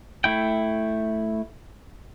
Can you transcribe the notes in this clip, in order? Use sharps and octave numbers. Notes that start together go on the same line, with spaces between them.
A3 E4 G5